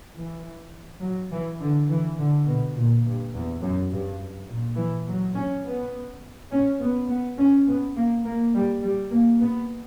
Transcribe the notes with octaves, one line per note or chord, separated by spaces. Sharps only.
E3
F#3
E3
D3
E3
D3
B2
A#2
G2
E2
F#2
G2
A#2
E3
F#3
C#4
B3
C#4
B3
B3
C#4
B3
A#3
A#3
G3
G3
A#3
B3